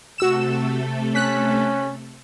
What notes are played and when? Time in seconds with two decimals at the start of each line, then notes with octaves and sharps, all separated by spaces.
0.18 C3 A3 F#4 A4 E6 E7
1.15 C#4 F#6 B6